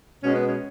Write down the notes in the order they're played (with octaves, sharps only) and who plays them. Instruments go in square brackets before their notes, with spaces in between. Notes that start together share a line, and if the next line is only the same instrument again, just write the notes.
[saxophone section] B2 G#3 C#4
B3
C#4